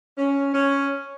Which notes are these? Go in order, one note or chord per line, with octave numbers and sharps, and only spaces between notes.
C#4
C#4